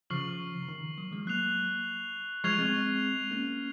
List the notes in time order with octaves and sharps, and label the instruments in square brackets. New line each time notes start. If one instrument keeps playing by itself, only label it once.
[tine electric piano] C#3 F3 [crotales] C#6 F6 C7 F#7
[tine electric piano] C#3
D#3
D#3 F#3
F3 G#3
[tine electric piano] F#3 A#3 [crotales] F#6 C7 F7
[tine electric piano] F3 G#3 [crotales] C#6 F6 G#6 C7 F7
[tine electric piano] G#3 C4
A#3 C#4